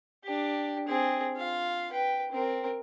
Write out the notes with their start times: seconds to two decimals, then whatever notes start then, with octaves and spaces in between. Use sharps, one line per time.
0.24 D4 G4
0.88 C4 G#4
1.36 F4 F5
1.92 B4 G5
2.31 C4 A#4